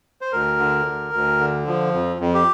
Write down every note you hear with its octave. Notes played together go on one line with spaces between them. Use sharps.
C5
D2 A#4
D3
D2
D2
D3
F3
F2
F2
G4